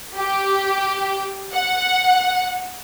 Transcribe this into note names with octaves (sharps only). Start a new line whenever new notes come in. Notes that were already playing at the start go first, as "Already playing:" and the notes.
G4
F#5